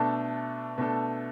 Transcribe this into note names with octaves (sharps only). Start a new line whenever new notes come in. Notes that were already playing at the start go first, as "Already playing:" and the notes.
Already playing: B2 A3 D4 A4
B2 A3 D4 A4